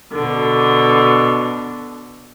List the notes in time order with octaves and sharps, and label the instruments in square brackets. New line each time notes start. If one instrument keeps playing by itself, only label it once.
[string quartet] B2 D3